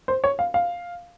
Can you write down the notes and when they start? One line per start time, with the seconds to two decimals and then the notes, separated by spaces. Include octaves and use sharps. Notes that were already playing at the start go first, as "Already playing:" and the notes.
0.08 C5
0.24 C#5
0.39 F5
0.54 F5